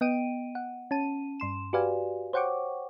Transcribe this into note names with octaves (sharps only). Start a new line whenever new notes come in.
B3 D#5 G5 D7 D#7
F#5
C#4 A5 D#7
G2 C6 E7
F#4 G4 B4 D5 F5 G#5
C5 C#5 F#5 G5 C#6 D6